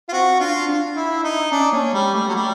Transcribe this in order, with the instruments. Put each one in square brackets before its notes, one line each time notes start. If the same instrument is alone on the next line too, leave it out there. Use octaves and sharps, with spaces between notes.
[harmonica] F4
[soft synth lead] C4 [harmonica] F#4
[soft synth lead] D4 [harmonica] F4
[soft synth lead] D4
[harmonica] E4
D#4
[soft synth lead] C#4 [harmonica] D4
[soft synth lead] A#3 [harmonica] C#4
[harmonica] G3 [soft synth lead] G#3
[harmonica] G3 [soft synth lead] A3
[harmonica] F#3
G3